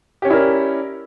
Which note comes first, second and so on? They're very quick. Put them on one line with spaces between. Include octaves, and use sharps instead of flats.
G4 C#4 D5 E4 A#4